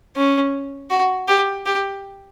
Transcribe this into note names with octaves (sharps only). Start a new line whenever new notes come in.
C#4
F#4
G4
G4